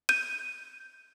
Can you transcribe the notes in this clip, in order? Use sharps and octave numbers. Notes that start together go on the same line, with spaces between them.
G6 D#7